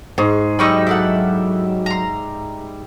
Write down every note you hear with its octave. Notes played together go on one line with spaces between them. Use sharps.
G#2 G#4 C#6
F#3 G3 D#4 B5 C#6 D#6 E6
E4 A4 E5 F#5
A#5 C6